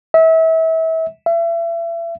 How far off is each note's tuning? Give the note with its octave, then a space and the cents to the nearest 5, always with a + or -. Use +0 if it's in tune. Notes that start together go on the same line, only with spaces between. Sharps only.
E5 -30
E5 +35